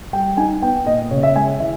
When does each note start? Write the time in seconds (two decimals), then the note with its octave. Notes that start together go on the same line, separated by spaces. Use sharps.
0.13 G3 G5
0.37 D#4 G#5
0.62 B3 G5
0.86 A#2 D#5
1.11 C#3 C#5
1.23 E5
1.36 G#3 G#5
1.60 E3 E5